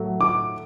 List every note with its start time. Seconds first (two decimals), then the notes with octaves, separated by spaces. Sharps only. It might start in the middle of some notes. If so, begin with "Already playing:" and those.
Already playing: A2 F#3 A3
0.21 D6